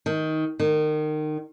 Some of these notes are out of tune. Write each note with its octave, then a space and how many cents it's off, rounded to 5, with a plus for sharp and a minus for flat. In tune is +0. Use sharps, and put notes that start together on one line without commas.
D#3 +15
D#3 -25